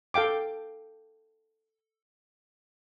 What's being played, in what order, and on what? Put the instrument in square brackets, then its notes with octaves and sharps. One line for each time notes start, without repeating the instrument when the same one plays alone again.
[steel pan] A4 F5 G5 D6